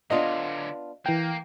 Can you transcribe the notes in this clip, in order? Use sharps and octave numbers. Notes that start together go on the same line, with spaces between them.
D3 F#3 B3 D4 F4 D#5 F5
E3 A#3 G5